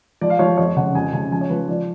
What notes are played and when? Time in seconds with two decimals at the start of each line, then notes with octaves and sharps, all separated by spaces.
0.21 F3 D5
0.30 F5
0.39 F3 C#5
0.58 F2 C#5
0.77 C#3 F#5
0.95 F2 G#5
1.13 C#3 G#5
1.32 F3 G#5
1.41 C#5
1.50 F3 B4
1.68 F3 D5